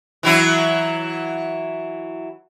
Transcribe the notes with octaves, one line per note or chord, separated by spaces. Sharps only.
E3 F#3 E4